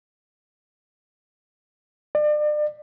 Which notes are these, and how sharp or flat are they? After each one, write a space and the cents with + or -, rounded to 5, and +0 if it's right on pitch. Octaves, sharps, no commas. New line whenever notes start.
D5 +35